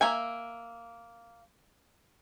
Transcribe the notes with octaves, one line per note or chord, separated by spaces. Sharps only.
A#3 E5 G#5